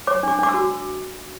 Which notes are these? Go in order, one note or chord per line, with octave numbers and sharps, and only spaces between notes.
C#5 D6
D4 D6
D4 D6
E6
F#4